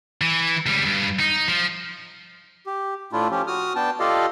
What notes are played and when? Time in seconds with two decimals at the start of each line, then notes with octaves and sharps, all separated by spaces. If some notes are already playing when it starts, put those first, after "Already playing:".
0.21 E3
0.66 C#2 G3
0.85 G2
1.20 D#4
1.48 F3
2.66 G4
3.13 A2 A3 D4 E4 F4
3.31 F3 C#4 G4
3.47 F#4 D#6 F6
3.76 B3 D4 G5 A5
4.00 F4 G4 A4 D5 D#5 F5